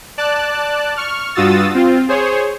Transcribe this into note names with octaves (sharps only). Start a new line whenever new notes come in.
D5 A5 F#6
C#6 F6
G2 F4 F#4 D#6 E6 A6
C4 F4
G#4 C5 C#5